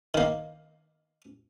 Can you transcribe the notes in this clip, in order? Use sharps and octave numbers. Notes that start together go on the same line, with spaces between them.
D#3 A#3